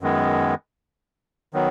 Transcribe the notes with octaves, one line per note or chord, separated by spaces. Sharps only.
F#2 D#3 G#3 B3
D#3 F#3 B3